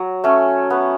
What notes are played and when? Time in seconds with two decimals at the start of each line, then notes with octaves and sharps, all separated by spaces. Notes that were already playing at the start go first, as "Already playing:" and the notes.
Already playing: F#3
0.24 A3 C#4
0.70 B3